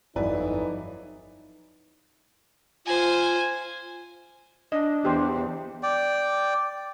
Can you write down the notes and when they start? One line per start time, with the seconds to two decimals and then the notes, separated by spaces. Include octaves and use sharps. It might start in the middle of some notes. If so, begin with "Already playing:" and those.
0.16 G1 F2 E3 F#3 D#4 E4 B4 D5
2.86 F4 C5 G#5
4.72 D4 D#5
5.05 E2 G4 C5
5.83 D5 G5